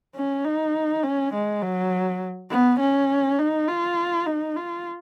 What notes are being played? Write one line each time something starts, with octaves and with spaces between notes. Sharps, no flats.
C#4
D#4
C#4
G#3
F#3
B3
C#4
D#4
F4
D#4
F4